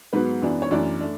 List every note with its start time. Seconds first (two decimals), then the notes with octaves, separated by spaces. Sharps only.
0.13 G#2 F#3 B3 B4
0.42 F#2 E3 B3 D4
0.62 C#5
0.71 F#2 E3 A3 D4 D5
1.00 A3 D4